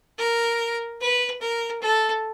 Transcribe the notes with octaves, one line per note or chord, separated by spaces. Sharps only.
A#4
B4
A#4
A4